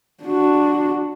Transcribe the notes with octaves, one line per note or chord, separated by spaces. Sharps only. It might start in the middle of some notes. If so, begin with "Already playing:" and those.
D4 F#4